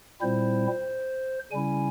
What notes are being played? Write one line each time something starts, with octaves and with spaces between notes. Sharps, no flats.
A#2 G3 C4 E4 C5
C#3 G3 C#4 E4 G#5